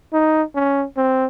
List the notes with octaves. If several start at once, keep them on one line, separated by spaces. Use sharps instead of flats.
D#4
C#4
C4